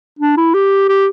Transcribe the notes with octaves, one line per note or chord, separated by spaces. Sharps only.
D4
E4
G4
G4